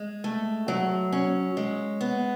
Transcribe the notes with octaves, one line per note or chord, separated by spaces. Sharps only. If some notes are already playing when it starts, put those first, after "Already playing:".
Already playing: G#3
A3
F#3
C#4
G#3
B3